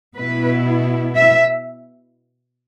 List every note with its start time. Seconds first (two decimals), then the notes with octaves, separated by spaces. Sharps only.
0.17 B2 B3 E4 B4
1.16 E5